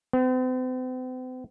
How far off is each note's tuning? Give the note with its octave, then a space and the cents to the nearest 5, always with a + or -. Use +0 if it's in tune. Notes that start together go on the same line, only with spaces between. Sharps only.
C4 -45